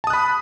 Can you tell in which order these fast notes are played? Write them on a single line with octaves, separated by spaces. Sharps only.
A5 D#6 F#6 B5